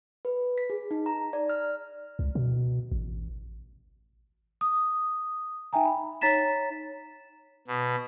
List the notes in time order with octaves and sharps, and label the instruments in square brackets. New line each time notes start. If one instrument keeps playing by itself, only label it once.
[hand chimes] B4
B6
G#4
D#4
A#5
D5
F6
[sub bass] C#2
B2
A1
[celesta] D#6
D#4 E5 G5 G#5 A#5
B5
D#4 C#5 A#5 A6 B6 E7
[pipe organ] B2